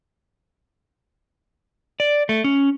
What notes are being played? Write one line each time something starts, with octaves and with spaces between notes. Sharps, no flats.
D5
A3
C#4